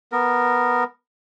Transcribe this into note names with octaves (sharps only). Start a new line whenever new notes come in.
B3 A#4